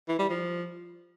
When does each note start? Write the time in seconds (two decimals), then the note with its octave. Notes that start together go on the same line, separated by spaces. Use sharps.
0.09 E3
0.19 G3
0.30 F3